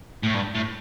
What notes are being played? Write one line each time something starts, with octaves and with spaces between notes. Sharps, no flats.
A2
G2
A2